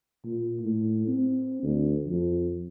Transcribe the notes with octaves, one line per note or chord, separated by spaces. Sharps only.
A#2
A2
C4
D2
F2